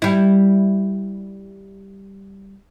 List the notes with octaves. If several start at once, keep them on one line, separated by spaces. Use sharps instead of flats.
G3 E4